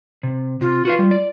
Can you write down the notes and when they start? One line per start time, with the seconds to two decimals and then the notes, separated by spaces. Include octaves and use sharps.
0.23 C3
0.61 C3 F4
0.85 F4 F#4 B4 F5
0.99 G3
1.11 D5